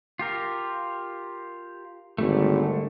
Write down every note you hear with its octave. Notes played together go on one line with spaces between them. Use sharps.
F4 G4 A#4
G#1 D3 G3 A3